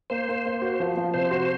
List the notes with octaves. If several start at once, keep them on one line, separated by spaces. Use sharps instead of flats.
A#3 C5
A#3
A#3
F#4
F3
F3
C3 C5
F#4